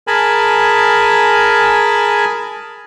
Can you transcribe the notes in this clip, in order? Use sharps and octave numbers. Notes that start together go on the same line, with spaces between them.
G#4 A#4 G#5 A5 B5